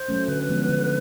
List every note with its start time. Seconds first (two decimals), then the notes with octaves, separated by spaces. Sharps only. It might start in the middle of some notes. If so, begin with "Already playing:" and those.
Already playing: C5
0.08 F#3 A3 C#4
0.28 D3 B4
0.49 F3 G#3 B3
0.69 D3